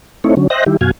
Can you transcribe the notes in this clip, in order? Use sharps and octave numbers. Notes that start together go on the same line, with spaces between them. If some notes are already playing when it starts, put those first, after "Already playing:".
A3 C4 D#4 E4 C#5
D3 F#3 C#4
C5 D#5 E5 G5 F#6 A#6
D#3 G3 E4 G4
F#2 B2 F#4 F5 G#5